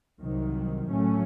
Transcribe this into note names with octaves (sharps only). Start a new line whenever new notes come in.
C2 C3 D#3 F#3
A2 F#3 A3 C#4